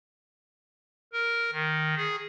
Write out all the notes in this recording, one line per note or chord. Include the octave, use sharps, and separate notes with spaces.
A#4
D#3
G#4